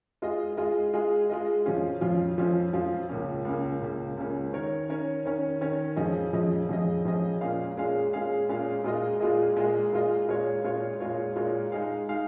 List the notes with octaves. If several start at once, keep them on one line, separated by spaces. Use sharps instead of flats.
G#3 F4 G#4 D#5
G#3 F4 G#4 D#5
G#3 F4 G#4 D#5
G#3 F4 G#4 D#5
F2 F3 C#4 F4
F2 F3 C#4 F4
F2 F3 C#4 F4
F2 F3 C#4 F4
C#2 C#3 A#3 C#4
C#2 C#3 A#3 C#4
C#2 C#3 A#3 C#4
C#2 C#3 A#3 C#4
D#3 C#4 A#4 C#5
D#3 C#4 A#4 C#5
D#3 C#4 A#4 C#5
D#3 C#4 A#4 C#5
F2 F3 C#4 G#4 D#5
F2 F3 C#4 G#4 D#5
F2 F3 C#4 G#4 D#5
F2 F3 C#4 G#4 D#5
A#2 G#3 C#4 G#4 F5
A#2 G#3 C#4 G#4 F5
A#2 G#3 C#4 G#4 F5
A#2 G#3 C#4 G#4 F5
A#2 G#3 F4 G#4 D#5
A#2 G#3 F4 G#4 D#5
A#2 G#3 F4 G#4 D#5
A#2 G#3 F4 G#4 D#5
A#2 G#3 F4 C#5
A#2 G#3 F4 C#5
A#2 G#3 F4 C#5
A#2 G#3 F4 C#5
G#3 D#4 G#4 F5
G#3 D#4 G#4 F5